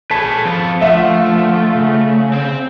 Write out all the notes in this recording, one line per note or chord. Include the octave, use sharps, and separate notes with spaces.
G#4 A4 B4 C#5 A5 B6
F3 C4 A4
A#2 D3 A3 F4 E5 F#5
C#3
C4